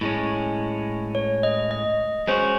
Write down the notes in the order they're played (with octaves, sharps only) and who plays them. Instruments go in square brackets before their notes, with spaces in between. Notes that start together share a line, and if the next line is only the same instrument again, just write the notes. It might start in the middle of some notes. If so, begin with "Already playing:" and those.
[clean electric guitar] A2 G#3 C#4
[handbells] C#5
D#5
D#5
[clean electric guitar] G#3 C#4 F#4 [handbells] C5